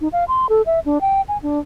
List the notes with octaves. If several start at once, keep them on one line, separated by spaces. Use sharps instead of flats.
D#4
F5
C6
A4
E5
D4
G5
G#5
D4